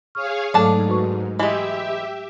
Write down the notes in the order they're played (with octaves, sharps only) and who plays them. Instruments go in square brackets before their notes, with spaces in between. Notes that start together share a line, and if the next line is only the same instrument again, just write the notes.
[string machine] G#4 C#5 F5 [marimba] C#6 F6
[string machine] G#2 [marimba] F#3 A3 A4 [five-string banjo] D4 A5
[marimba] F#4 B4 C#6
[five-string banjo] E3 G#3 [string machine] G4 E5 [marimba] D#5